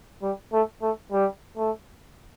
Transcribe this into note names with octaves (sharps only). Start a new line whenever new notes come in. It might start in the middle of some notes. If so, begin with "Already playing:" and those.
G3
A3
A3
G3
A3